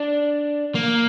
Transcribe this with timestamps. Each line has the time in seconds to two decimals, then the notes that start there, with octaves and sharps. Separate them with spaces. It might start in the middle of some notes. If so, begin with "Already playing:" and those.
Already playing: D4
0.75 A#3